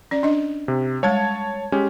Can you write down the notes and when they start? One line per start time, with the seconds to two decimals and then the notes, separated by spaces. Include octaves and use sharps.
0.11 C#4 D5
0.23 D4 D#5
0.68 C3
1.03 G3 G#3 C#5 A5 G#6
1.72 G#3 C#4 G4